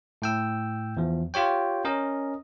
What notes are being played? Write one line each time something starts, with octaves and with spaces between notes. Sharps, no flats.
A2 G5 E6
E2 F3
F4 G4 C#5 G5
C#4 A#4 D#5